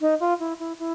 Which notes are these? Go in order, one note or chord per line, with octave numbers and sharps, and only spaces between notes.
D#4
F4
E4
E4
E4